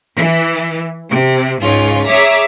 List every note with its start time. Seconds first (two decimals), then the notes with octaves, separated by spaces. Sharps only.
0.18 E3
1.12 C3
1.62 C#2 G#2 C#4 F4 C#5
2.07 G#4 C#5 E5 A#5 D6